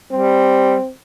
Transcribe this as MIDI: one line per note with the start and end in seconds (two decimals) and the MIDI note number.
0.12 0.76 55
0.12 0.91 60